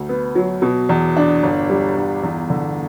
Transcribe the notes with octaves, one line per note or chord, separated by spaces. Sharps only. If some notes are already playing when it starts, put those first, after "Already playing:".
Already playing: D2
B3
F#3
B2
E2
D4
G1
G3
G1
E2
D3